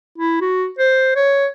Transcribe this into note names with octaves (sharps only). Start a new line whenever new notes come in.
E4
F#4
C5
C#5